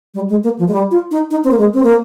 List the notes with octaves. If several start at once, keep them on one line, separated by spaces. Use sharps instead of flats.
G3
G#3
A#3
F3
G#3
G3
F4
D#4
D#4
C4
A#3
G#3
C4
A#3